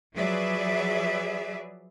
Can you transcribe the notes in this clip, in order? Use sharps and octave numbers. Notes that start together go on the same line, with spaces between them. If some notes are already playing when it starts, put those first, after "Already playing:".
F3 F#3 G#4 B4 D5 E5